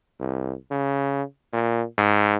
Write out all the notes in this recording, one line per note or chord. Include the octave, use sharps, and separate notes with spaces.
C2
C#3
A#2
G#2